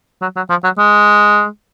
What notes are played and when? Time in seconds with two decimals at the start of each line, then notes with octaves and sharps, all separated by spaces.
0.22 F#3
0.36 F#3
0.50 F3
0.64 F#3
0.78 G#3